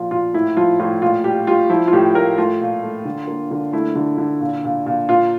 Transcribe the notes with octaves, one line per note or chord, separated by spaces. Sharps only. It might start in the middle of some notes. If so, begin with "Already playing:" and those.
Already playing: A#2 F3 F4
A#2 F4
A2 E4
F3 F4
A2 F4
A#2 F4
G3 G4
G3 F4
F3 E4
F4
A2 G4
A2 A#4
A3 F4
A#2
A3
D3
A#3
D3
A3 E4
D3
D3
A#2
A#2
A#2
A#2 F4